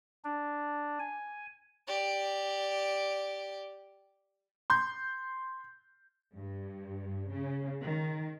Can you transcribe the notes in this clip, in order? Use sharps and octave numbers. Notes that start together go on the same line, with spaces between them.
D4
G#5
G4 D5
C6 G6
G2
C#3
D#3